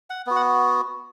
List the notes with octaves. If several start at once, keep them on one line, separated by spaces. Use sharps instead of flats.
F#5
B3 F#4
F#5